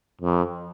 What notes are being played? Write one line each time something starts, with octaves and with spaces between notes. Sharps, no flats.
F2